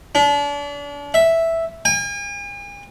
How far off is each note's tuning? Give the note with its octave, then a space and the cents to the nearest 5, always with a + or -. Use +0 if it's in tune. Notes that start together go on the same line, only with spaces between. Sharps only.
D4 -35
E5 +0
G#5 -45